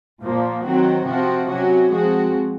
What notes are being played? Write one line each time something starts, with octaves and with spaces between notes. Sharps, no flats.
A#2 F3 A#3
D#3 F#3 C4 F#4
C3 F3 C4 F#4
C3 F#3 C#4 F#4
F3 G#3 C4 F#4